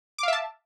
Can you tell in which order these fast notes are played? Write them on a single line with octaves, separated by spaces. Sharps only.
D6 F5 E5 A5